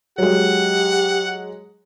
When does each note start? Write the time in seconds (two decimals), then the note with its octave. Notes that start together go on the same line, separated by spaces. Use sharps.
0.18 F#3 G#3 G4 F#5